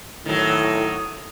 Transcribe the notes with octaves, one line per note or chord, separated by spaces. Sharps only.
A2 D#3 F#3